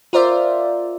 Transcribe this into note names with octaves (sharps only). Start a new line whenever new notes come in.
F4 A#4 C5 D5 E5